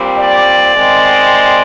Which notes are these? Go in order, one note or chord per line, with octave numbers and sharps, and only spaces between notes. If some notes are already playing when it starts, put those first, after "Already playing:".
Already playing: A#2 G3 C4
D5
D#3 G#3 C4